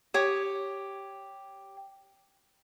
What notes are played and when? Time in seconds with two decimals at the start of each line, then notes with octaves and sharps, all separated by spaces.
0.14 G4 C#5 D#6